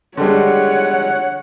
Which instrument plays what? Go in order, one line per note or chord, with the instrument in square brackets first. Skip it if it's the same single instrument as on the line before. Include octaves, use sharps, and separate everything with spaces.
[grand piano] D3 G3 G#3 [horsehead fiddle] C#5 [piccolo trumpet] F#5